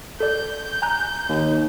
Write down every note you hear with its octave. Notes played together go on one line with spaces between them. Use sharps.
A4 D5 G6
G#5 A#5 F#6
D#2